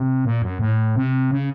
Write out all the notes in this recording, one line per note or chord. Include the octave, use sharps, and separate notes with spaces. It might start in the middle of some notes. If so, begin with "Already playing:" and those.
Already playing: C3
A#2
F#2
A2
C3
C#3